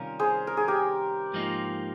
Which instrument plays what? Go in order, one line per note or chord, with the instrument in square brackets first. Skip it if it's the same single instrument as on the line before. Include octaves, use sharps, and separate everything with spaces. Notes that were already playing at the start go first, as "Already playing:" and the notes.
Already playing: [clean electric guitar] C3 D#3 G3 C#4 F4 [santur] A#4
[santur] G#4 C5
A#4
G#4
G4 A#4
[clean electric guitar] G#2 F3 A#3 D#4